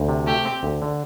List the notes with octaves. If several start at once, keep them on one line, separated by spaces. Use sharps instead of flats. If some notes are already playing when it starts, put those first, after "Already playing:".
Already playing: D2
C3
A3 G4
C4
D2
D3